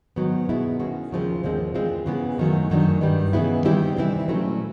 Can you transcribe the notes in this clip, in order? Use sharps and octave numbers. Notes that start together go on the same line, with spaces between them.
G#2 D#3 F#3 B3
B2 G#3 B3 E4
D#3 G#3 C#4 F#4
D#2 C#3 F3 G#3 C4
D#2 D3 F3 G#3 C4
E3 G#3 C4 F4
C#3 E3 G#3 B3
F#2 D#3 F#3 A3
F#2 D#3 F#3 A3 D4
G2 D#3 G3
C#3 E3 G#3 B3 E4
D#3 G3 C4 E4 G4
C3 E3 G3 C4 E4
A#2 F#3 A3 C#4 E4